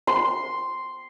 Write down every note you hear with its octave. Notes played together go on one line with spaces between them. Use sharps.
C6